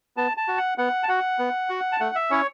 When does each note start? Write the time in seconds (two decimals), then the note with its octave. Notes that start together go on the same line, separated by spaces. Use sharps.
0.17 B3 A5
0.37 A5
0.48 F#4
0.58 F#5
0.78 B3 F#5
1.03 A5
1.08 F#4 F#5
1.39 B3
1.69 F#4
1.92 A5
2.00 A3 F#5
2.15 E5
2.30 C#4 E4 C#5